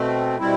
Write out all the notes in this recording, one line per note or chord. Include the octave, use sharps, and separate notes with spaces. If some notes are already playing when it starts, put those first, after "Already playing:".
Already playing: B2 A3 C4
B2 G3 C4 E4